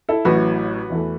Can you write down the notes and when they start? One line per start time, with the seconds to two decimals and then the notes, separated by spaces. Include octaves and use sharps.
0.09 E4 A4
0.25 A1 A2 F#3 F#4 B4
0.90 E2 E3 A3